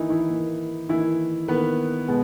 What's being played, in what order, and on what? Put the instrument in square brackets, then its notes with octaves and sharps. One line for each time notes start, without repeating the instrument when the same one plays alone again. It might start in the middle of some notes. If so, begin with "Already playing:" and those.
Already playing: [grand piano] D#3 E3 A#3 D#4 E4
E3 E4
D#3 A#3
D#3 E3 A#3 E4
D#3 A#3 B3 B4
B2 G#3 B3